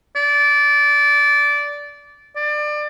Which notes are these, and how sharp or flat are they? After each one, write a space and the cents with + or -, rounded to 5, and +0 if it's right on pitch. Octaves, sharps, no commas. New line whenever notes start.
D5 -20
D5 +25